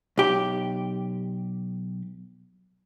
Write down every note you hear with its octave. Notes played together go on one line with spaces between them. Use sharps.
B1 G4